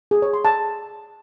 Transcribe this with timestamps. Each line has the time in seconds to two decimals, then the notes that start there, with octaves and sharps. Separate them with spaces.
0.11 G#4
0.22 C#5
0.33 C6
0.45 A5